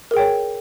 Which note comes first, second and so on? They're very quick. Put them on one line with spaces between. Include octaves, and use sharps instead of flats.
A#4 G#4 G5 C#5